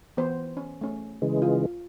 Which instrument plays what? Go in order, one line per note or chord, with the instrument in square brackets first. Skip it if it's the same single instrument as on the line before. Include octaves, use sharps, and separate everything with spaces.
[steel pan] E3 B3 C5
C#4
A3 C#4
[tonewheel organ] C#3 E3 G#3
[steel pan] F4